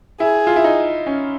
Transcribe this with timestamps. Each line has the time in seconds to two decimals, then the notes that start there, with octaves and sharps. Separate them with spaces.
0.20 E4 G#4
0.47 F4
0.56 E4
0.64 D#4
1.07 C#4